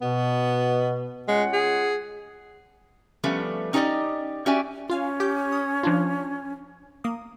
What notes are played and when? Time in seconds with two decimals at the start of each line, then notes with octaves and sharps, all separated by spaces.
0.01 B2 B3
1.28 G#3 C#4 F4 F#5
1.53 G#4
3.24 F3 G3 A3 B3 C#4
3.73 C#4 D#4 G4 G#4 D5 D#5
4.46 C#4 F#4 G4 D5 E5 G#5
4.90 C#4 F4 F5 G#5
5.20 G4 D6 G6
5.52 D#6
5.83 F3 D4 F4
7.04 A#3 D#6